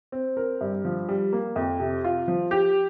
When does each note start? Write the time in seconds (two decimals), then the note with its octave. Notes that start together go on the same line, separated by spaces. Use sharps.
0.12 C4
0.37 A#4
0.61 G2
0.85 F3
1.09 G3
1.33 A#3
1.56 F2
1.79 C3
2.04 F4
2.28 F3
2.51 G4